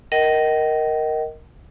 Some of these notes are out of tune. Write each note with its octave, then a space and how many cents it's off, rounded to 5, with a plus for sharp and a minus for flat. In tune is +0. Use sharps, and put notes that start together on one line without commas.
A#4 +0 D#5 +10 G5 -45